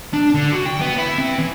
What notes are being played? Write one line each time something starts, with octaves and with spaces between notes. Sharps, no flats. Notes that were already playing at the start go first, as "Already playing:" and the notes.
D4
D3
F#4
G5
B3
E4
C4
E3